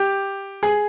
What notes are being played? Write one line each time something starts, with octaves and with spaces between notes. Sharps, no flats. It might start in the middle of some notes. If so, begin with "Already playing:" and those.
Already playing: G4
G#4